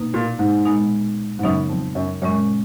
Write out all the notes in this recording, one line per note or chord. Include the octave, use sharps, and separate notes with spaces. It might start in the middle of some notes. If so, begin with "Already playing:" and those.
Already playing: B2 A#3 D#4
A#2
G#2
A#2 G#3 B3 D#4
G#2
F#2 C#3 F#3 B3 D#4
F2
F#2
F#2 A#2 G#3 C#4